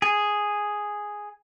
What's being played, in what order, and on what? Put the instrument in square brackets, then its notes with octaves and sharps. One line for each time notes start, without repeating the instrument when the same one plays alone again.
[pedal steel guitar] G#4